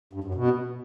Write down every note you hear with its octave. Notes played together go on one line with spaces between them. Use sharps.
G2
F#2
B2